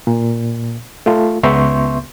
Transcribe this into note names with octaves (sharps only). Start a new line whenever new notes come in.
A#2
A3 F4
C#2 B3 E5 C6 C#6 G6